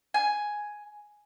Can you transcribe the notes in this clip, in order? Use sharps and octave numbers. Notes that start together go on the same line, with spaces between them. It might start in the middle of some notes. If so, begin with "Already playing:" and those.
G#5